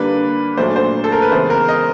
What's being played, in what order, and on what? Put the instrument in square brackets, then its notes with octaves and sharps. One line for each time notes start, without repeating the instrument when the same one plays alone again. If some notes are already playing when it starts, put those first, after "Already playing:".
Already playing: [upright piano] D3 G3 A#3 D4 B4
A#2 F#3 A3 D4 C5
C5
A4
A#4
B4
C#3 E3 G#3 B3 C5
A#4
D#5